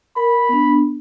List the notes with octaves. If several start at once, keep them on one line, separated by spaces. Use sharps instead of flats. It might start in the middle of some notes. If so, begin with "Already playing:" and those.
A#4 B5
B3 D4